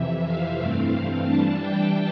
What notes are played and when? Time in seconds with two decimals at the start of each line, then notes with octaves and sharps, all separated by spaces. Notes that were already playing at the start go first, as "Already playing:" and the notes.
Already playing: F2 C3 E3 E5
0.25 F5
0.59 G2 E3 A3 C4
1.26 E3 G3 D4 A5
1.60 G5